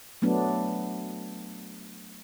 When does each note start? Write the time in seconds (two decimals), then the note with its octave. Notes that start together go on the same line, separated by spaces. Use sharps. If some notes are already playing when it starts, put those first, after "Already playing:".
0.22 F#3 A3 B3 D4